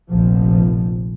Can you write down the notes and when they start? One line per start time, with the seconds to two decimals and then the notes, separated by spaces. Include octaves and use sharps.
0.10 F1 A#1 F3